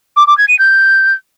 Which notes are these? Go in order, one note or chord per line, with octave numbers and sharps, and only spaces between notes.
D6
D6
G#6
D#7
G6